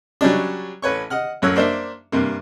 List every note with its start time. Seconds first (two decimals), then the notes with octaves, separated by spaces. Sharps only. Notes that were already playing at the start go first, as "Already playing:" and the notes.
0.21 F#3 G3 C#4 D4
0.82 A1 B4 C#5 C#6
1.10 D#5 F#5 F6
1.42 A1 F#2 C#5 E6 F#6
1.56 A#3 D4 C5 D5 E5
2.12 G2 C3 A#3